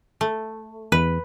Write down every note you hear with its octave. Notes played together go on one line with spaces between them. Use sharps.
A3
E2 B4